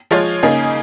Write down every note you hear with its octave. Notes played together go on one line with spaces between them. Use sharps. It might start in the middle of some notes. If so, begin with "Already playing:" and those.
F3 G#3 F4 C#5
C#3 A#3 D#4 G#4